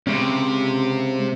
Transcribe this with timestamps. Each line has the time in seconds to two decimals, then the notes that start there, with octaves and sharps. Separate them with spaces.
0.07 C3 G#3 C#4